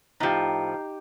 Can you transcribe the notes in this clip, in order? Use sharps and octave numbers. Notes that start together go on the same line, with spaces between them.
A2 F3 D#4 G4